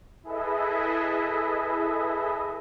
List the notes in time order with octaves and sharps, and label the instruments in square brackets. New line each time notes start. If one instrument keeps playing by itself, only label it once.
[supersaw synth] E4 G#4 A4 B4 D#5 E5